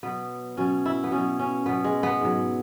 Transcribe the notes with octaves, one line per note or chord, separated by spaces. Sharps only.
B2 F#3 B3
B2 F#3 C#4
E4
B3
B2 F#3 C#4
C#4
B2 F#3 B3
G#3
B3
G#2 F#3